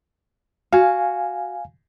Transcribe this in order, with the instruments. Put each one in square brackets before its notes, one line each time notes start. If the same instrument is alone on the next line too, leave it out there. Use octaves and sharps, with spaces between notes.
[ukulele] F#4 [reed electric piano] F5 G#5